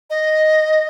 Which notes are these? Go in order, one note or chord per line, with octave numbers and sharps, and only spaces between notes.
D#5